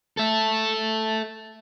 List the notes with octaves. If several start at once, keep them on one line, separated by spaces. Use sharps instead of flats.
A4 E5